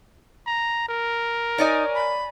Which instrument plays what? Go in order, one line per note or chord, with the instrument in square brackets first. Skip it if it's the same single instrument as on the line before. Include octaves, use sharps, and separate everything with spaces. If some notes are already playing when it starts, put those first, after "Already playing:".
[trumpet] A#5
A#4
[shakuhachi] D#4 [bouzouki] C#5 D5 G#5
[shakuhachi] B5